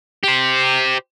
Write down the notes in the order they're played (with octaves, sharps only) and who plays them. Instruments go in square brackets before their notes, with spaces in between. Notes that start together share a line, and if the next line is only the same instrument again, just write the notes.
[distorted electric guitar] G4 C5